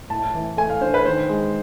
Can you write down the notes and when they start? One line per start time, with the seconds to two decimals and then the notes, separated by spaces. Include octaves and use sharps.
0.10 A2 A5
0.34 E3
0.57 A3 G#5
0.70 F5
0.81 D4 C5
0.94 B4
1.05 D#3 C5
1.29 G#3